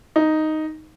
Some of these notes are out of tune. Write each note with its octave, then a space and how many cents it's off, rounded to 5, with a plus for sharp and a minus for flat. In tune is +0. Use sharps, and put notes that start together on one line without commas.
D#4 +0